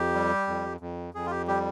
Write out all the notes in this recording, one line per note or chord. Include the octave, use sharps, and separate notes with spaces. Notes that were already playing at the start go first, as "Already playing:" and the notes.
Already playing: F2 G4
G3
F2
F2
F2 G#4
F4
G4
G3 G4